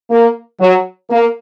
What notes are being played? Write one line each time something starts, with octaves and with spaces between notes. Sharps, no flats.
A#3
F#3
A#3